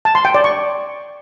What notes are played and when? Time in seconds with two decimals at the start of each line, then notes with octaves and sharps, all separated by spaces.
0.05 A5
0.15 C6
0.25 G5
0.35 D5
0.44 C#6